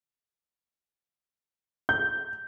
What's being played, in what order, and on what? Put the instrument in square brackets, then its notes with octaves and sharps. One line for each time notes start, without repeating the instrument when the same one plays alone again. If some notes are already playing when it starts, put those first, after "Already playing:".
[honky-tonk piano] G6